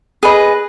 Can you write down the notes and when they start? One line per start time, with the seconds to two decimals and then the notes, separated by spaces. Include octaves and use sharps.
0.23 G#4 B4 D#5